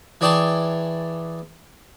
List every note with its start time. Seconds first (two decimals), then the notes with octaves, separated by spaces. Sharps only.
0.21 E3 G#4 D5 G5 A5 C#6